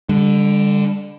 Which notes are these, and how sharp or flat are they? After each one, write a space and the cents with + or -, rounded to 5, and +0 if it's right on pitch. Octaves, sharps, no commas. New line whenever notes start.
D3 +0 G3 +40